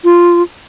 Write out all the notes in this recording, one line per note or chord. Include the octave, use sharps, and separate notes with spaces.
F4